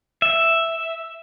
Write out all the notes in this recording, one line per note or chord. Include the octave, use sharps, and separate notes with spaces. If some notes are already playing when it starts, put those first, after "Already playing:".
E5